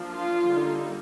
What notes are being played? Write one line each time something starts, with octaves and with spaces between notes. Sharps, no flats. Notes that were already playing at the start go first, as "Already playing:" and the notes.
Already playing: F3 A#3 D4
F4
D3 G3 A#3 D#4